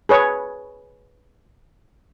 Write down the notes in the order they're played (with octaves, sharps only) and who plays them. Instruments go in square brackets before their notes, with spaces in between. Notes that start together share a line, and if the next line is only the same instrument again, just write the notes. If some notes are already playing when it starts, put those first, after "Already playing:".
[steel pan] G#4 B4 C#5